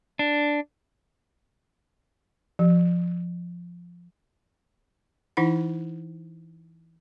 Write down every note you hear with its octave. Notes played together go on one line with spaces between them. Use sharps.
D4
F3
E3 D#4 E4 F#5